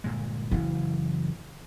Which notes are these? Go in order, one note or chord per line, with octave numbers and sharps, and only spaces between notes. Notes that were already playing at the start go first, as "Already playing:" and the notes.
G1 A#2 G#3
F#1 C#3 E3